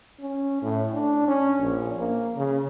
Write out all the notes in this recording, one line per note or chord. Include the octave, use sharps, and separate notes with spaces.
C#4
A2
D4
C#4
A#1
A#3
C#3